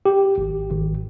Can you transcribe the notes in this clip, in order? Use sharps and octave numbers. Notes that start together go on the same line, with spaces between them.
G4
G#1
G#1